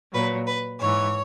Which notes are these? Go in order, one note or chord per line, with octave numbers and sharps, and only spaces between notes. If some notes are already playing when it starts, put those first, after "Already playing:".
A#2 F#3 B4
B4
G#2 E3 C#5